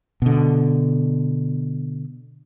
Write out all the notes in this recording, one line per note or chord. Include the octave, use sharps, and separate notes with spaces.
B2 D3